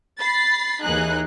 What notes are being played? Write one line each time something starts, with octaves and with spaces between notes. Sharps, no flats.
B5 A6 C7
D#2 E3 D#4 G#4 F#6